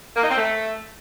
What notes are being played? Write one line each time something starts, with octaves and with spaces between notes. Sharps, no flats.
A#3
D#4
C4
A3